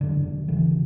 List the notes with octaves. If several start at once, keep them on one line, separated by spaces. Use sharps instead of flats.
E1 F#2 D3
F#1 C#3 E3